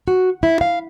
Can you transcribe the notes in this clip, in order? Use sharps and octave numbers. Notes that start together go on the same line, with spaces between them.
F#4
E4
F5